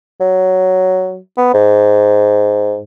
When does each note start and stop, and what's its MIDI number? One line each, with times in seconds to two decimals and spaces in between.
0.21 1.18 54
1.37 1.49 59
1.54 2.80 44